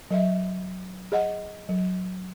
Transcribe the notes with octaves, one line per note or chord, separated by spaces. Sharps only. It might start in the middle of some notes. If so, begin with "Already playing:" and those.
F#3 D#5 E5
G#4 D#5 F#5
F#3